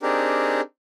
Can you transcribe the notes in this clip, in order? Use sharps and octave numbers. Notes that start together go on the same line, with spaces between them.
C4 D4 D#4 G4 G#4 A#4